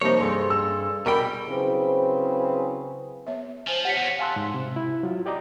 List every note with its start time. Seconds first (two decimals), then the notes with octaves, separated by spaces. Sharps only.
0.01 C3 F3 G3 A#3 D#4 C#5
0.20 G2 G#4 A4 C6
0.50 E6
1.06 B2 G3 A#4 G5 B5
1.48 C#3 F#3 C4 E4 G#4 B4
3.26 B3 C#5 E5
3.67 F3 C5 G#5
3.85 G4 C#5 F#5 B6 C#7
3.97 E2
4.19 F5 G#5 A5 C6 E6 F#6
4.36 G#2
4.54 C3
4.76 E4
5.03 F#3 F4
5.26 G4 D5 D#5 A#5